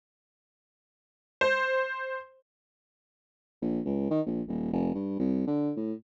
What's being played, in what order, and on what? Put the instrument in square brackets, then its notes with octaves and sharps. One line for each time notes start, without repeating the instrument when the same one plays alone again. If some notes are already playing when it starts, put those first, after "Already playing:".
[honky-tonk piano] C5
[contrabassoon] A#1
C#2
D#3
A#1
D#1
F1
G2
C2
D3
A2